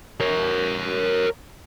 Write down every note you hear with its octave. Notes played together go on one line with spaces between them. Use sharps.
A#4 C#5